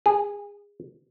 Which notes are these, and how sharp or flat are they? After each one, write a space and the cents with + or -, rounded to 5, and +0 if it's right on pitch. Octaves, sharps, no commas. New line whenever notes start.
G#4 -25